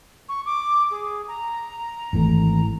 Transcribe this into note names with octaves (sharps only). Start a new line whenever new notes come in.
C#6
D6
G#4
A#5
G#1 E3 A3